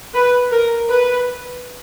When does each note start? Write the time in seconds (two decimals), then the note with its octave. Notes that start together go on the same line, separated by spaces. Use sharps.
0.14 B4
0.51 A#4
0.88 B4